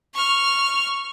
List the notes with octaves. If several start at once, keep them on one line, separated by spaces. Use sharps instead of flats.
C#6 F6